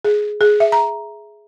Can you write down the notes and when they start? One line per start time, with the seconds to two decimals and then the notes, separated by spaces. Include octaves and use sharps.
0.05 G#4
0.41 G#4
0.60 E5
0.72 A#5